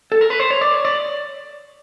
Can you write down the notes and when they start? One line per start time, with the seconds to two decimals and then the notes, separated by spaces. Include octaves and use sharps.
0.12 A4
0.21 A#4
0.30 B4
0.40 C5
0.51 C#5
0.61 D5
0.74 C#5
0.85 D5